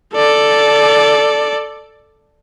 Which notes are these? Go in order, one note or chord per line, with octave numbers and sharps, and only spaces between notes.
A4 D5